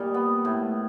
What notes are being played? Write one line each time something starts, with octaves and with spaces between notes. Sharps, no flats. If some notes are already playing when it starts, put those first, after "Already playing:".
Already playing: A#2 G3 D#5 F5
B3
A2